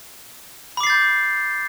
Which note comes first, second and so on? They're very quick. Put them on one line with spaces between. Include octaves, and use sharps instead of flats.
B5 D6 C7 A6 G6